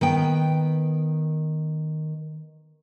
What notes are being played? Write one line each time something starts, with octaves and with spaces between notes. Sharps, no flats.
D#3 B3 G5